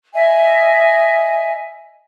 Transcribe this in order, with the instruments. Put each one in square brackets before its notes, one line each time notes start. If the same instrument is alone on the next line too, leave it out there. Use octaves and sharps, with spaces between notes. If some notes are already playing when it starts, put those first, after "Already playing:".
[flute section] D#5 E5 G#5